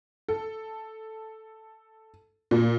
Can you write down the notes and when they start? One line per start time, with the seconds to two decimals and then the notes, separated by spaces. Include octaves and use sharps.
0.29 A4
2.51 A#2